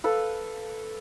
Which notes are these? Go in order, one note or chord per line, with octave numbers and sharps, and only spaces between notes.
A4 B4 F5